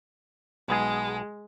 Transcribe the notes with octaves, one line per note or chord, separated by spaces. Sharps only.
B1 G#3 B3 G#4